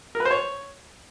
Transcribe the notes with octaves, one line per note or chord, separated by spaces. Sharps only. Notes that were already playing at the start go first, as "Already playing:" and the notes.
A#4
B4
C5
C#5